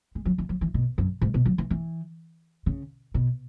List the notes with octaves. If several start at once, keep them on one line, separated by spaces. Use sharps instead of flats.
G#3
F#3
E3
F#3
E3
B2
F#2
G#2
B2
F#3
E3
E3
C#3
B2